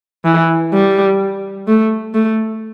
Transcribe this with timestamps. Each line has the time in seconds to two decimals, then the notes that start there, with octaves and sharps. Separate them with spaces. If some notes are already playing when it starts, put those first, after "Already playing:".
0.25 E3
0.73 G3
1.68 A3
2.14 A3